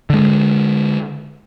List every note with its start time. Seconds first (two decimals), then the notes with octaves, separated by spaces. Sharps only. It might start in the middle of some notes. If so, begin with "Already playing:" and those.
0.10 D3 G#3